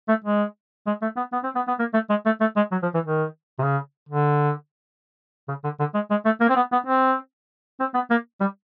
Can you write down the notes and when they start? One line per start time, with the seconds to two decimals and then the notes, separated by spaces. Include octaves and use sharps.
0.09 A3
0.24 G#3
0.87 G#3
1.02 A3
1.17 B3
1.33 B3
1.44 C4
1.55 B3
1.68 B3
1.79 A#3
1.94 A3
2.10 G#3
2.25 A3
2.41 A3
2.56 G#3
2.72 F#3
2.83 F3
2.94 E3
3.06 D#3
3.59 C3
3.63 C#3
4.09 D3
5.48 C#3
5.64 D3
5.80 D3
5.94 G#3
6.10 G#3
6.25 A3
6.41 A#3
6.49 C4
6.56 B3
6.72 B3
6.86 C4
7.80 C4
7.94 B3
8.11 A#3
8.41 G3